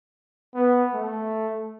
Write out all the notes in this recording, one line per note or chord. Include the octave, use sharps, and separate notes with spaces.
B3
A3